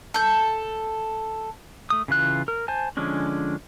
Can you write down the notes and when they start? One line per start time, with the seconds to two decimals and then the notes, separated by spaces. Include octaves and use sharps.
0.14 A4 G6
1.90 A3 D#6
2.08 C#3 E3 F4 F#6
2.48 A#4
2.68 C5 G#5 A5
2.97 D3 F3 G#3 C#4 D4